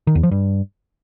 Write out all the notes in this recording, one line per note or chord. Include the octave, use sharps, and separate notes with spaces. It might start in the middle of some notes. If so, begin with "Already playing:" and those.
D#3
E2
F3
G2